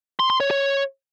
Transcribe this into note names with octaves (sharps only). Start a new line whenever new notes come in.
C6
C6
C#5
C#5